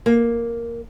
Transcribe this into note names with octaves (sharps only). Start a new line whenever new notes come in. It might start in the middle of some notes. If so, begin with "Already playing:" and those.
A#3